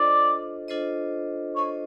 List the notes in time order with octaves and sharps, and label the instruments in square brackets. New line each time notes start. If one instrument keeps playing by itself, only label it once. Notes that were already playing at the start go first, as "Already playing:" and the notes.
Already playing: [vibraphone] D4 F4 A4 C5 D#5 [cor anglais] D5
[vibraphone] D4 F4 A4 C5 D#5
[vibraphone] D4 F4 A4 C5 D#5 [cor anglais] C#5